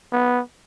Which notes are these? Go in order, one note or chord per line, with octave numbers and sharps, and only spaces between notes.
B3